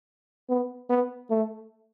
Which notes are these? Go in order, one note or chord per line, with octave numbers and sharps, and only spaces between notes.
B3
B3
A3